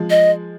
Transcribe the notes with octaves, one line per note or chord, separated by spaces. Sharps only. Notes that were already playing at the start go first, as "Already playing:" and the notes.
Already playing: F3 G#3
D#5